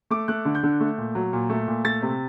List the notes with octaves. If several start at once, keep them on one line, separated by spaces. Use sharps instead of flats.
A3 D6
A3 F#6
D3
G6
D3
A3
A#2
F#3
A#2
A3
A#2
A3 A6
C3